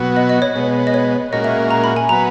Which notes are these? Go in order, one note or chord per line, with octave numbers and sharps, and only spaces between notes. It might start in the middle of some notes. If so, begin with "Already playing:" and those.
Already playing: B2 F#3 B3 F#4
D#5
D#5
C#5
B2 G#3 B3
D#5
C#5
A#2 G#3 C#4 F#4 A#4 D#5
E5
A#5
B5
G#5
F#3 B3 F#4 B4 A#5